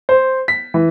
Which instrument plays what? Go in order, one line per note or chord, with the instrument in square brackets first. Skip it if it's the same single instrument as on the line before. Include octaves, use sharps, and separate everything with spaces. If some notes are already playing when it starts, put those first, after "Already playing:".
[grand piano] C5
B6
E3